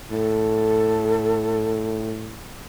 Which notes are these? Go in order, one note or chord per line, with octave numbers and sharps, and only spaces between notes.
A2 A4